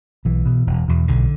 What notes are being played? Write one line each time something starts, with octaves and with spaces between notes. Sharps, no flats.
B1 E3
B2
E1
E2 B2
B1 D3